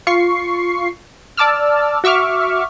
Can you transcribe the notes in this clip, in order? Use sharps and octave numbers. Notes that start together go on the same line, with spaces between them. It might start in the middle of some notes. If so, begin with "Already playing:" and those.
F4 C#6 C7
D5 A5 D6 E6 F6
F#4 E5 C#6 D6 F6